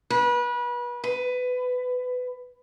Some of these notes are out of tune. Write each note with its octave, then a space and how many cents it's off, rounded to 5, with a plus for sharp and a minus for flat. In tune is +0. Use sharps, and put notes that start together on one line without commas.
B4 -30
B4 +20